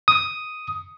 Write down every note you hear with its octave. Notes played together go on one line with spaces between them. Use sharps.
D#6